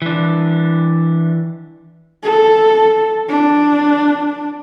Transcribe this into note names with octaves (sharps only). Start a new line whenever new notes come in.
E3 D4
A4
D4